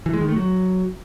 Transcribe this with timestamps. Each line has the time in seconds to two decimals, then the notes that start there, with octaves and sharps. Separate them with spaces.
0.06 E3
0.14 G#3
0.21 D#3
0.29 A3
0.36 F#3